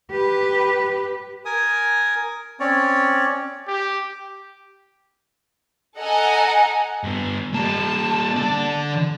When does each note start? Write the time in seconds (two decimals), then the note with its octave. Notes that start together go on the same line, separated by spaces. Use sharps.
0.11 G4 B4
1.45 A#4 G#5 D#6
2.60 C4 C#4 C#5 D5
3.68 G4
5.97 A4 D#5 F#5 G#5 A#5
7.03 G2 B3
7.55 G3 A#3 A5
8.37 D3 D5